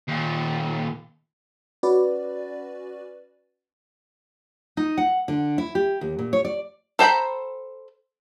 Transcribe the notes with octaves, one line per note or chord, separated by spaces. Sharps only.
D#2 A#2
C#4 F#4 B4 D5
D#4
F#5
D3
E4
G4
D#2
A#2
C#5
D5
A4 C5 G5 A#5 B5